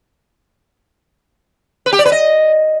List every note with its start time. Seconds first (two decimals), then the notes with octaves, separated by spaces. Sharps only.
1.86 B4
1.93 G4
1.99 D5
2.05 B4
2.12 D#5